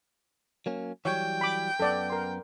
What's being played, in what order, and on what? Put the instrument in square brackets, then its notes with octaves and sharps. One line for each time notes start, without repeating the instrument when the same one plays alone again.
[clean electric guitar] F#3 A#3 C#4
[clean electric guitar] E3 F#3 G3 [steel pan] C#5 [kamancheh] G5
[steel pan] B5 D6
[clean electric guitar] F#2 B3 [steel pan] A4 D5
[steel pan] A#4 C6